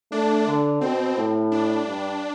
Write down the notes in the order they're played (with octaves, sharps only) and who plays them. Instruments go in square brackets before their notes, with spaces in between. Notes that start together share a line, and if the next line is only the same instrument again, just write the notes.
[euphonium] A3 [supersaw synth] D4
[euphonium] D3
[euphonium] B2 [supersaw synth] C4
[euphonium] A2
[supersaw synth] D4
[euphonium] G2